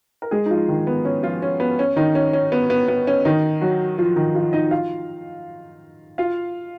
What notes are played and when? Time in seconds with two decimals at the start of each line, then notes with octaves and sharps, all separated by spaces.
0.22 A#4
0.31 G#3 G#4
0.46 D#4
0.50 F3 F4
0.68 D#3 D#4
0.87 B3
1.05 C#4
1.23 F3 F4
1.42 C#4
1.60 B3
1.79 C#4
1.96 D#3 D#4
2.15 C#4
2.33 C#4
2.52 B3
2.70 B3
2.88 B3
3.07 C#4
3.25 D#3 D#4
3.61 F#3 F#4
3.98 F3 F4
4.16 D#3 D#4
4.35 F3 F4
4.53 D#4 D#5
4.71 F4 F5
6.18 F4 F5